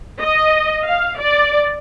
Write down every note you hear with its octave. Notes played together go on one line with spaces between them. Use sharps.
D#5
F5
D5